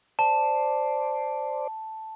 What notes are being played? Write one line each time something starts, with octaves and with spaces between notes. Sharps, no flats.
C5 D5 A5